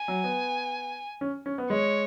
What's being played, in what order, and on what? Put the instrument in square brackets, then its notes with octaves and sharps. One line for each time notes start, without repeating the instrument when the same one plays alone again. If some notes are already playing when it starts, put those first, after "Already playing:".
Already playing: [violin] G#5
[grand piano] F#3
B3
C#4
C#4
B3
[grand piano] G#3 [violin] C#5